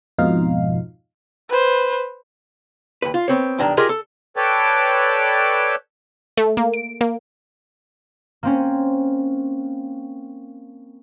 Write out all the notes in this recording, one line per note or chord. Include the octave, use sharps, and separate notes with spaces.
F2 G#2 B2 D#4 F4 F5
B4 C5
D#2 B4
F4
B3 C4 C#5
B1 G2 D#3 D4 A#5
F4 G4 G#4 A#4 D#5
A4
A4 B4 C#5 D5 G5 A5
A3
A#3
D7
A#3
A#3 C4 C#4